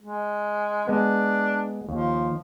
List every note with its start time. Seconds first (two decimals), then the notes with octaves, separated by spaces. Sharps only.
0.01 G#3
0.87 G#3 B3 D4
1.89 D#2 F3